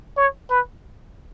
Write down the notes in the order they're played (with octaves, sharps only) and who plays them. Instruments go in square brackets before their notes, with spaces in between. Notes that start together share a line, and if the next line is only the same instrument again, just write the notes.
[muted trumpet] C#5
B4